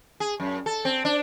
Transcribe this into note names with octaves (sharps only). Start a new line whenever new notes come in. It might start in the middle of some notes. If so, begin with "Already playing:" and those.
G#4
F#2
A4
C4
D4